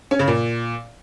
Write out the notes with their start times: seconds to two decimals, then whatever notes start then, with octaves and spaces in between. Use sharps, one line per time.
0.11 C#4
0.19 C#3
0.28 A#2